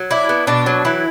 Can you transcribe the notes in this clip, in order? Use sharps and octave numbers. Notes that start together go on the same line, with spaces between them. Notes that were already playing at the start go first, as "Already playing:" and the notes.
Already playing: F#3
D4 E4
B3
B2 D4
F#3
E3 E4